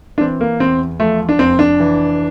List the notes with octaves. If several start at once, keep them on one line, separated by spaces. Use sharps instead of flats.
D4
E3 C4
A#3
E2 C4
F3 A3
D4
F1 C4
D4
E3